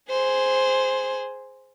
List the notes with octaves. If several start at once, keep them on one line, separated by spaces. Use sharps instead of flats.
G#4 C5